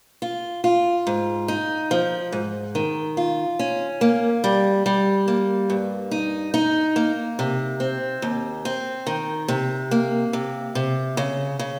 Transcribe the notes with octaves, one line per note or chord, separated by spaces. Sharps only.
F4
F4
G#2
D#4
F3
G#2
D#3
F4
C#4
A#3
G3
G3
A#3
G2
D#4
D#4
A#3
C3
C4
D#2
C4
D#3
C3
A#3
C3
C3
C#3
C#3